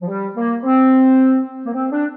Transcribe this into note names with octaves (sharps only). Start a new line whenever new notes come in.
F3
G3
A#3
C4
A#3
C4
D4